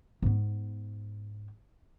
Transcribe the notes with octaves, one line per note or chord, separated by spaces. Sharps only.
G#2 B3